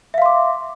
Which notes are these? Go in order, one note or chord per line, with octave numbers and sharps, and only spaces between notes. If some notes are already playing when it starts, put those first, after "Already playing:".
E5 F5 C6 D6